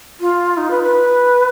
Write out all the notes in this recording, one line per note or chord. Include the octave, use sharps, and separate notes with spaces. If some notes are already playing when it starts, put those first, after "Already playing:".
F4
D#4
B4
B4